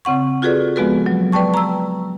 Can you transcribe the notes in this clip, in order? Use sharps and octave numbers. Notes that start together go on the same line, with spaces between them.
C#3 C4 F#5 C#6
F4 F#4 G#4 A4 B4 D5
F3 G#3 B3 F#4 A4 B4
F#3
B4 D5 G5 A5 C#6
A#5 E6